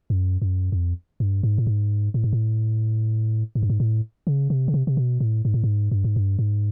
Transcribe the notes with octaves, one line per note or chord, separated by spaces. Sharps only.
F#2
F#2
F2
G2
G#2
A2
G#2
A2
G#2
A2
G#2
G2
G#2
A2
C#3
C3
C#3
C3
C3
B2
A2
G#2
A2
G#2
G2
G#2
G2
G#2